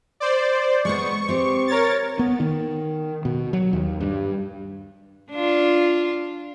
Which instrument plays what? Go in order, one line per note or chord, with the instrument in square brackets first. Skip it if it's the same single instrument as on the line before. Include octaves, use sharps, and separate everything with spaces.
[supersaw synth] C5 D5
[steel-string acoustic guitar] G#3 B3 [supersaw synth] C#6
[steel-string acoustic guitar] C4 G4
[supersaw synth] A#4 C#5 A6
[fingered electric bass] B3
D#3
B2
F#3
D#2
G2
[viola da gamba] D4 F4